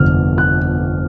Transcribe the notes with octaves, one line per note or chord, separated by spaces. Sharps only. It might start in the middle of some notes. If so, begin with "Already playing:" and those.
Already playing: G1 F2 C3 F6
F#6